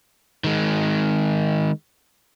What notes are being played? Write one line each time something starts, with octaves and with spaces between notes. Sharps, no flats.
D#3 G#3